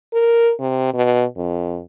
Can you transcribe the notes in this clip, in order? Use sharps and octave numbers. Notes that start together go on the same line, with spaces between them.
A#4
C3
B2
F2